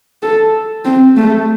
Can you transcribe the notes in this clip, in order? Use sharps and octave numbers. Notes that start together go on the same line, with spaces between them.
A4
C4
A3